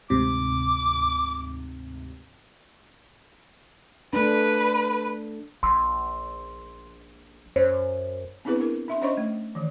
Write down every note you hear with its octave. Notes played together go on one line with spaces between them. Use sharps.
D2 G#2 C3 D6
A3 D4 B4
A#1 C6 E6
F#2 C5 C#5
B3 C4 D4 E4 G#4 B4
E4 A#4
D4 E5 C6
C#4 C5 C#5 D#5 C6 C#6
A3
D#3 E3